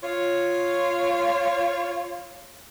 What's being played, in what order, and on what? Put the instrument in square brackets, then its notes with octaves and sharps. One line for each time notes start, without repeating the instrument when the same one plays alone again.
[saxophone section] F4 C#5